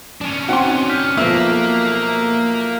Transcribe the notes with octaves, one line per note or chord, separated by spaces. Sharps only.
C#4 D4
C4 D#4 F#4 F#5 G5 C6
F6 G6 B6
B1 F3 A#3 B3 E5 E6